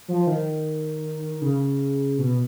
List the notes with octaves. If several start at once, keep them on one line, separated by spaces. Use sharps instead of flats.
F3
D#3
C#3
B2